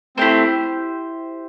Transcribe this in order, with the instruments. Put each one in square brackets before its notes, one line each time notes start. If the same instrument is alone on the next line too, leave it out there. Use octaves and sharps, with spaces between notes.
[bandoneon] A3 C4 [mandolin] E4 G4 C5